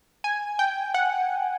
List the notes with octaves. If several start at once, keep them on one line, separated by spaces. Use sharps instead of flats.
G#5
G5
F#5